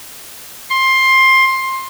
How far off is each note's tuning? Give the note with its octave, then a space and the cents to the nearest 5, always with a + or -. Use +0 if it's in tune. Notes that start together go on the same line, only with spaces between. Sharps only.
C6 +15